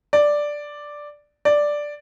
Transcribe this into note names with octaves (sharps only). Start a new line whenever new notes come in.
D5
D5